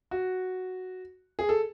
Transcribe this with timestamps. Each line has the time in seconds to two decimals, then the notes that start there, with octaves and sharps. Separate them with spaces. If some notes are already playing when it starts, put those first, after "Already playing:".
0.11 F#4
1.39 G#4
1.49 A4